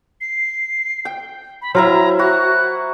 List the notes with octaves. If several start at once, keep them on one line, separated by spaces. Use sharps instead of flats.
C7
G5
B5
F#3 E4 F4 A#4 C5 A#5
F#4 F#6